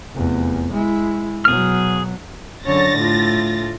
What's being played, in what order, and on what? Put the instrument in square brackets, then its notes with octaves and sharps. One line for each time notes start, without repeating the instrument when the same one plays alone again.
[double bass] F1 E2
G#3 E4
[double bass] B2 F#3 [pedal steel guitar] G#4 F6
[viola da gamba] F#2 D3 C#5 [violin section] A6 A#6
[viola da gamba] A2 F4